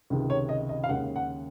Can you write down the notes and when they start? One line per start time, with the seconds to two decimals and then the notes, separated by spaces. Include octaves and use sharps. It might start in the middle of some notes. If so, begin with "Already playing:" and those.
0.10 C#2 C3 D#3 G#3
0.30 C#5
0.49 D#5
0.69 D#5
0.84 F5
0.89 D#2 C#3 G#3 F#5
1.16 F#5